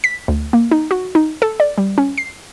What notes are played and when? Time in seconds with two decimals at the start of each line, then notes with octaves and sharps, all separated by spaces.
0.04 B6
0.28 D2
0.53 A#3
0.71 D#4
0.91 F#4
1.15 D#4
1.42 A4
1.60 D5
1.78 G3
1.98 C#4
2.18 C7